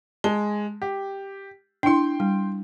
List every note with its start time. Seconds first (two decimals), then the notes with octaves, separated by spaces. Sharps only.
0.24 G#3 A5
0.82 G4
1.83 D4 E4 G5 C6
2.20 G3